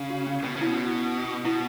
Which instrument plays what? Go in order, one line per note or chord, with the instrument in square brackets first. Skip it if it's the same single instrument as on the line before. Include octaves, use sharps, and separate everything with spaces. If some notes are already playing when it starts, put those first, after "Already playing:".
Already playing: [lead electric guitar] C#3
[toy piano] F#4
C#4
[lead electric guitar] B2 [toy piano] C#4
[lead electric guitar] C#3
[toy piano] E4
[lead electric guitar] B2
[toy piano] F#4
[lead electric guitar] B2 [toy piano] E4